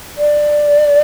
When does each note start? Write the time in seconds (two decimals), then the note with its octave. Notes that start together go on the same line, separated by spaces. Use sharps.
0.18 D5